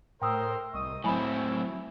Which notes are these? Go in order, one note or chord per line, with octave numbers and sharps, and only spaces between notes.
A2 A#4 C5 G5 C6 D#6 E6
C2 D#5 C#6 D#6
A2 F#3 C4 E4 G#5 B5